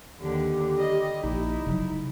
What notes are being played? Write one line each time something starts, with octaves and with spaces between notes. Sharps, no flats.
D#2 D3 G4
G3 D#5
A#1 D#4 E4
C#3 F#3